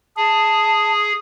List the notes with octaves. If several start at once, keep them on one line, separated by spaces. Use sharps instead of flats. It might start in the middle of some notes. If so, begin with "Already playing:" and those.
G#4 A5